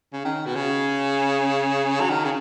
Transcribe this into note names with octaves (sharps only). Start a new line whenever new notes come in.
C#3
D#3
B2
C#3
F#3
D#3
C#3